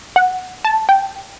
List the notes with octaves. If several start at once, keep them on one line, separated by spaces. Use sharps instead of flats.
F#5
A5
G5